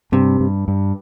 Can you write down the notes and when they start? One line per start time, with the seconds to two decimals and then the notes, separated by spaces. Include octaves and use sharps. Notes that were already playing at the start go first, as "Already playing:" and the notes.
0.12 G2 C3
0.40 G2
0.68 G2